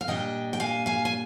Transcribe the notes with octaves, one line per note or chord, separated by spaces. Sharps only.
F5
A#2 G3 D4 D#5 G5
G5
F5 G#5
F5 G#5
G#5